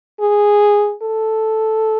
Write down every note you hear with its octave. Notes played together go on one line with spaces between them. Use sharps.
G#4
A4